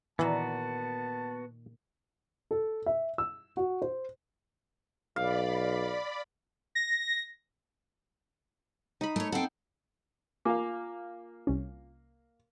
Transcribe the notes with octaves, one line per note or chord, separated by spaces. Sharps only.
A#2 D#3 E3 A#3 B3 F#4 A5
A4
E5
E6
F#4
C5
B1 D5 F5 B5
A#6
D#4 B5
A3 C#5
C4 A4 F#5 G5
A#3 F4 F5 G#5 D6
C2 C#4